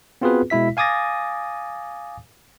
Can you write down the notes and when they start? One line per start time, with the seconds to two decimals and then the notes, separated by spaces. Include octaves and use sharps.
0.21 B3 C4 F4 F#4 G#4 B4
0.50 B2 G#3 E4 E5 B6
0.77 F5 G#5 D6 D#6 A6 A#6